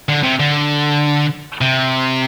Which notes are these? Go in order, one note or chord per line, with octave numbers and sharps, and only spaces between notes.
D3
C3
D3
C3